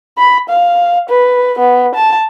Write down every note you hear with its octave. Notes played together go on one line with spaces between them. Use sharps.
B5
F5
B4
B3
A5